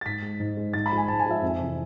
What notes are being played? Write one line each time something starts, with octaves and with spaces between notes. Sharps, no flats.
A6
G#2 B6
G#3
G#2
G#3
G#2 A6
B5
F3 G#3
G#5
G#2 A5
G#5
F3 G#3 E5
F2
C3 E3